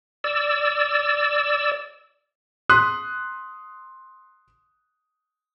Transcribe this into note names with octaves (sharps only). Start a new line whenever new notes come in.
D5 E6
C6 D#6 F#6 B6